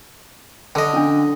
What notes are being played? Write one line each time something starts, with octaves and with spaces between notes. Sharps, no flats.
D3 D#5 A5
C#4 D4